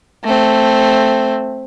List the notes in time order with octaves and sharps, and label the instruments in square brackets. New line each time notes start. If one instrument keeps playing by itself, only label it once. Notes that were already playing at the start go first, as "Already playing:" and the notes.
[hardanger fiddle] A3 C4